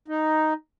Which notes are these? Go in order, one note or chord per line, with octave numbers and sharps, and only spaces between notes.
D#4